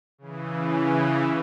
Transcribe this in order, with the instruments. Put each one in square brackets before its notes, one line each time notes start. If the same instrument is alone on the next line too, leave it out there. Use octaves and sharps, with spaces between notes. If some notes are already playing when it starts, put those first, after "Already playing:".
[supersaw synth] C#3 E3